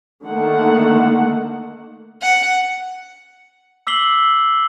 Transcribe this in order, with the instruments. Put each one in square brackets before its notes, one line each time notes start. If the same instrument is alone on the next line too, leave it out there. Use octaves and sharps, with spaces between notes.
[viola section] D3 D#3 A3 A#3 F#5
[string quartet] F#5
[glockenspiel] D6 E6 B6 C7 F#7 G7